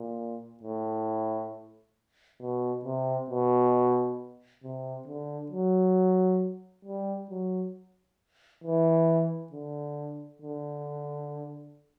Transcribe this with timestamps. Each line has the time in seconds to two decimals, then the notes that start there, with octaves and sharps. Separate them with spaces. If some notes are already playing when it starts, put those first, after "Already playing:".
Already playing: A#2
0.63 A2
2.41 B2
2.85 C3
3.30 B2
4.63 C3
5.07 D3
5.51 F#3
6.85 G3
7.30 F#3
8.64 E3
9.52 D3
10.42 D3